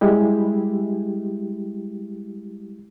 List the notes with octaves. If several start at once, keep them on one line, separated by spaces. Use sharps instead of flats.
G3 G#3 E4 G4